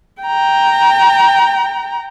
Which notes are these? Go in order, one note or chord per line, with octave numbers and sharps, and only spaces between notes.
G5 A#5